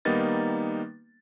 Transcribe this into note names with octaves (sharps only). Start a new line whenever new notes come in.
D#3 G3 A#3 B3 D#4 A6